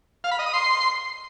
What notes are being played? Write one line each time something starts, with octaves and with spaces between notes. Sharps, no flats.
F5
B5
D#5
D#6
C6